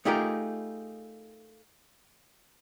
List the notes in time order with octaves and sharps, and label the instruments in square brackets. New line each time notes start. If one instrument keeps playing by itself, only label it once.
[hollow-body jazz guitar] A3 D#4 F4 G4 G#4 A#4